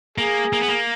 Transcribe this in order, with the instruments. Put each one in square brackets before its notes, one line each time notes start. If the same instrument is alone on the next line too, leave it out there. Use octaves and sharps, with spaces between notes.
[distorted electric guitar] A#3 [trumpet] G#4
[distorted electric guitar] A#3
B3
A#3